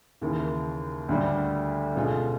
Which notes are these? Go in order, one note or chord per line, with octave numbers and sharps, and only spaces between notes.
D#2 C#3 E3
D2 D3 G3
B2 G#3 C#4 F4 A4